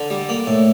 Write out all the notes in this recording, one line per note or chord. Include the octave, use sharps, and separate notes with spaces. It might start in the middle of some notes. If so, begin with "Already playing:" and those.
Already playing: D3
G3
A#3
A2